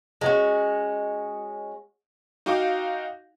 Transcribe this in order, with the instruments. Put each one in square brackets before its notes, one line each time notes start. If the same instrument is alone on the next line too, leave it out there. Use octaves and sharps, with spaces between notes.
[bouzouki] G#3 C#4 F#4
[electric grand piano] D#4 F#4 F5 G5 D6